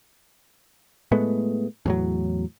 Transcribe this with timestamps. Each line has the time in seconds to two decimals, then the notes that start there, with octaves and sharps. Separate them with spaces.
1.12 A2 G#3 A3 B3
1.86 E2 A2 F#3